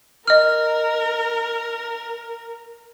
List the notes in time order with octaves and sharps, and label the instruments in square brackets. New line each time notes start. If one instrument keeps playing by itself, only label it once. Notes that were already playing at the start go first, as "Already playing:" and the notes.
[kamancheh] A#4 [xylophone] D#5 F6